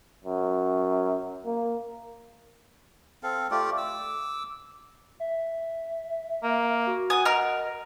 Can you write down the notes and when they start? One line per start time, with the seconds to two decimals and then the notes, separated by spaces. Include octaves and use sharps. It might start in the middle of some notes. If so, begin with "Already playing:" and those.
0.24 F#2
1.45 A#3
3.23 C4 A4 F5
3.51 A3 F4 G4 D5
3.78 D6 E6
5.20 E5
6.43 A#3
6.87 F#4
7.10 F#5 G#5 D#6
7.25 A#4 D#5 F6